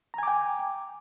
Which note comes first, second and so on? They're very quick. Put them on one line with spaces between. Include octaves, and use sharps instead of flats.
A#5 G#5 D6 G5